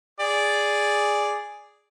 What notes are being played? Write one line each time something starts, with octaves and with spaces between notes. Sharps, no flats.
G#4 D5